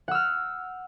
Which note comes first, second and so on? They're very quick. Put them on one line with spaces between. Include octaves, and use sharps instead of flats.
F#5 E6 F6